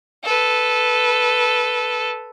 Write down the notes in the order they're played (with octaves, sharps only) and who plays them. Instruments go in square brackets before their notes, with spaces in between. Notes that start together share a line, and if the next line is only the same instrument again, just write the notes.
[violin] A4 B4